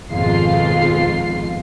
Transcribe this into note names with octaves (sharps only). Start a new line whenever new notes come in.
G#1 F2 B2 G#3 F4 C7